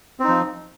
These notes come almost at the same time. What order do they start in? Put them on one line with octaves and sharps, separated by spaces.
C4 D#4 F3